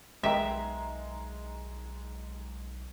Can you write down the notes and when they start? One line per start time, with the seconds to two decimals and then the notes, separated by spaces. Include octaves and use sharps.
0.23 B1 D#3 G#3 B3 E5 G5 A#5